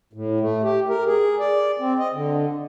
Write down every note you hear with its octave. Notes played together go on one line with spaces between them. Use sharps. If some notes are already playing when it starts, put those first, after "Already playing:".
A2
A3
G4
A#4
G#4
D5
C4
D#5
D3